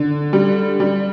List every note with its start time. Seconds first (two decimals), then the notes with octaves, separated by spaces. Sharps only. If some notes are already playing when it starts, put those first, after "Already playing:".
Already playing: D3
0.33 G3
0.80 G3